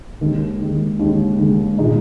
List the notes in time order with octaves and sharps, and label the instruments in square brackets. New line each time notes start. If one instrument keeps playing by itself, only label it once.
[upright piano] D#2 D#3 G#3
D#2 D#3 G#3
D#2 D#3 G#3
D#2 D#3 G#3
A#2 G#3 D#4